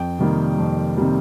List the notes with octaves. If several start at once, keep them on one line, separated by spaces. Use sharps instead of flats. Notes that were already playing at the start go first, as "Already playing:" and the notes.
Already playing: F2 G5
C3 D#3 G3 A#3
F2
C3 D#3 G3 A#3